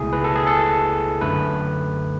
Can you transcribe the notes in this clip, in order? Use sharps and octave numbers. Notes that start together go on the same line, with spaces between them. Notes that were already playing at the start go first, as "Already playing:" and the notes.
Already playing: C#2 B2 A3 E4 G#4
B4
A4
G#4
A4
F#2 D3 A3 B4